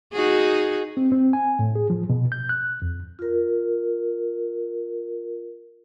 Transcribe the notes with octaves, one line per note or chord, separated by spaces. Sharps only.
D#4 F#4 G#4
C4
C4
G#5
A2
G#4
F3
B2
G6
F#6
F2
F4 A#4